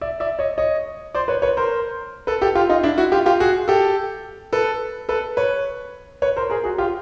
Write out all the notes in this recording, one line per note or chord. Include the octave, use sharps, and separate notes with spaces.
D5 E5
D5 E5
C#5 D#5
C#5 D#5
C5 D5
B4 C#5
B4 C#5
A#4 C5
A4 B4
G4 A4
F4 G4
D#4 F4
D4 E4
E4 F#4
F4 G4
F4 G4
F#4 G#4
G4 A4
A4 B4
A4 B4
B4 C#5
B4 C#5
A#4 C5
G#4 A#4
F#4 G#4
F4 G4